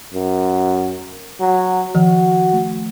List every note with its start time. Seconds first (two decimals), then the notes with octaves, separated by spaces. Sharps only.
0.14 F#2
1.40 F#3
1.95 D#3 F3 F#4
2.53 A3